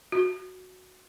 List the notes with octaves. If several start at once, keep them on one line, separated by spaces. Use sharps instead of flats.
F#4